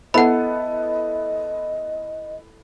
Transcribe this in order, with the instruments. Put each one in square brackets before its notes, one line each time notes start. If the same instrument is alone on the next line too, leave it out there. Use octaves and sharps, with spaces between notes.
[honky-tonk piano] B3 E4 A4 [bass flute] D#5 [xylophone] F#5 B5